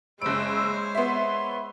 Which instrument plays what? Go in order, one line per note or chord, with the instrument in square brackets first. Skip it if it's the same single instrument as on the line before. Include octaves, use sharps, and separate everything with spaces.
[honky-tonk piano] F#1 D7 [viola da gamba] G#3 C5 [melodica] E4 C#5 [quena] E6
[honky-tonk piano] B3 E5 [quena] C6